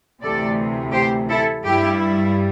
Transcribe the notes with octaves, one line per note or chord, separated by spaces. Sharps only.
D2 C3 E3 A4 D5
G4 C5
E4 A4
G2 G3 E4 G4